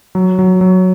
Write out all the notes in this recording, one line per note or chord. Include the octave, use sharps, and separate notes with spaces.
F#3
F#3
F#3